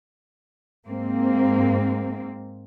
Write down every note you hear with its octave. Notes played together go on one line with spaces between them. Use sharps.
G#2 A#3 C4